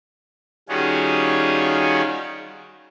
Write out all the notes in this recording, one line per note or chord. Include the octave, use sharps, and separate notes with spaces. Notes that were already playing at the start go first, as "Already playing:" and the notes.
D#3 G3 C#4 F4 F#4 G#4